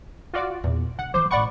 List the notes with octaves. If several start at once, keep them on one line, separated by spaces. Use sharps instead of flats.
F4 F#4 D5
E2 A#2
D3 F#5
E3 F3 C5 D6
A1 A2 D5 F#5 B5 C#6